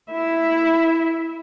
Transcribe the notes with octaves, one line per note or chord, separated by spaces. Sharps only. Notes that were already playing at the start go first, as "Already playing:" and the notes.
E4 E5